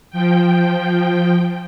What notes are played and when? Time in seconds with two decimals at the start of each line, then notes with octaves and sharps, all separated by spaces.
0.10 F3 G5